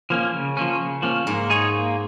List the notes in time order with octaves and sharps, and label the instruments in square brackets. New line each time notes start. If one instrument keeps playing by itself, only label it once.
[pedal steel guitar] F3 A#3 C#4
C#3
F3 A#3 C#4
C#3
F3 A#3 C#4
[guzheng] G#2 [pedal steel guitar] A#3
[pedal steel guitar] D#4 G#4 C#5
A#3